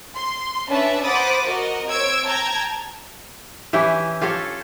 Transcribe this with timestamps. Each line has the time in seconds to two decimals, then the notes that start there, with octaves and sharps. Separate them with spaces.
0.16 C6
0.70 C#4 D4 B4 C#5 E5 A5
1.05 C5 F#5 B5 D6 D#6 A6
1.45 F#4 A#4 D#5
1.88 C4 C#5 E6 G#6 D7
2.25 G5 A5 A#5 G#6
3.73 E3 C#4 E4 G4
4.21 F4 G4 A4 C#5